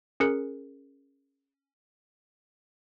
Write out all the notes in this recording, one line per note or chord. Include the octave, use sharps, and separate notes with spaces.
C#4 G#4 A#4 F#6 C#7